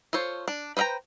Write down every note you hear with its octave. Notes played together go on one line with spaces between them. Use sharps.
F4 A4 C5 C#5
D4
B4 C5 E5 G5 A#5